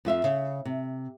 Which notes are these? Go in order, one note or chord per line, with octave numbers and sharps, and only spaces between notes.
F2 F4 E5 F5
C#3
C3